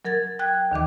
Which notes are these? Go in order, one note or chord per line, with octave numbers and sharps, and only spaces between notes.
F#3 A#4 G#6 A6
G5 F#6 G#6
D#2 D#3 E3 D6